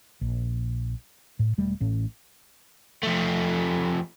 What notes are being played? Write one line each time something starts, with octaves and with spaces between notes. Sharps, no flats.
A#1
A2
E1 G3 A3
A1 A2 C#4
F3 A3